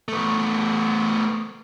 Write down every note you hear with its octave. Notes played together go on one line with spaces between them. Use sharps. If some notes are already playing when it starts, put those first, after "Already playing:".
A3 B3